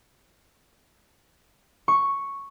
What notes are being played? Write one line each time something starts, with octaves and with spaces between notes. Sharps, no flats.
C#6